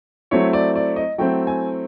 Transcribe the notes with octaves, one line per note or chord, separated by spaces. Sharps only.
F#3 A3 C4 E4 C#5
D5
D5
D#5
F#3 A3 C4 E4 G5
G#5